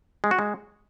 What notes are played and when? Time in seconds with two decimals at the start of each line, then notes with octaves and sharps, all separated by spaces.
0.24 G#3
0.31 F#4
0.39 G#3